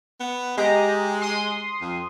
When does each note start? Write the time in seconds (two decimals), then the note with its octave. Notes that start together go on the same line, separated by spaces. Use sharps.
0.20 B3
0.57 G#3 G4 D#5 A#5
1.21 C6 D#6
1.81 F2